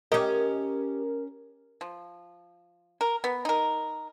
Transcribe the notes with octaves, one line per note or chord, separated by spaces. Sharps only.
C#4 G4 A#4 D#5
F3
A#4
B3
D#4 A#4